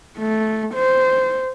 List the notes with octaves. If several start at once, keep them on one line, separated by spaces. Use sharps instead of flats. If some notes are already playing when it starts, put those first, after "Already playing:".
A3
C5